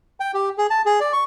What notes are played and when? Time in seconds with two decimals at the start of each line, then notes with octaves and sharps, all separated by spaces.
0.20 G5
0.34 G4
0.58 G#4
0.70 A5
0.86 G#4
1.00 D5
1.13 C#6